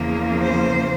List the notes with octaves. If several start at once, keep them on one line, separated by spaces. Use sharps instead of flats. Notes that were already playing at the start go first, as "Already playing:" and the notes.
Already playing: E2 C#3 F3 A#3
C5